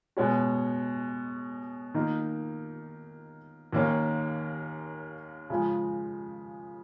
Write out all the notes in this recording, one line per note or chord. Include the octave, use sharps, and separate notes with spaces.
B2 G#3 C#4 F#4
D#3 A#3 D#4
D#2 D#3 A#3 C#4
C#3 F3 G#3